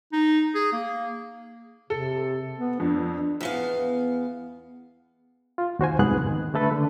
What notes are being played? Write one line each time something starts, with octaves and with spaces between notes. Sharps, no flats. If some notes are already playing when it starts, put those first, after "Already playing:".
D#4
G#4
A#3
C3 A4
B3
F2 D4
E2 B3 F5
F4
D#2 F#4 C5 G#5
C2 F2 G#2 B3 G#4 F#6
D#3
D3 A3 A4 B4
D3